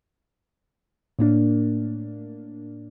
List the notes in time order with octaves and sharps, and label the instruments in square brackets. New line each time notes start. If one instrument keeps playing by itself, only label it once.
[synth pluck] A2 A#3 D4